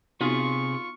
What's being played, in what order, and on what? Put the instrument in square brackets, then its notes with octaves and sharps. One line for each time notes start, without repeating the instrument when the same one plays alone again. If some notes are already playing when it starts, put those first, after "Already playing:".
[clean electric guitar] C3 G#4 [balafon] B3 D#4 F#4 [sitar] F4 [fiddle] C#6